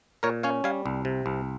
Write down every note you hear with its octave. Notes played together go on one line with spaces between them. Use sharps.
A#2 A#4 C#5
C#4 C#5 F5
G3 F5 G#5
C2
C3
C2